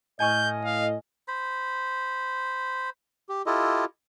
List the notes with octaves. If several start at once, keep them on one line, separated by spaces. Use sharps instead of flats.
A2 D#5 G#5 C#6 F6 G6
F5
C5 B5
G4
E4 F4 G4 A4 D#5